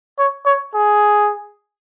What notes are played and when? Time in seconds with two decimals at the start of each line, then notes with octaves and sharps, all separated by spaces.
0.19 C#5
0.46 C#5
0.75 G#4